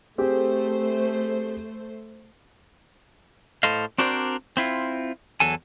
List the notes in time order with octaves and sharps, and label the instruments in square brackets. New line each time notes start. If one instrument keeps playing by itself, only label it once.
[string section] A3 C5 [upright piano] C4 G4 G#4
[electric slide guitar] A2 A4 C5 D#5 F5
C4 D4 F#4 A#4 C5 D5
C4 E4 F4
E2 F#3 A4 G#5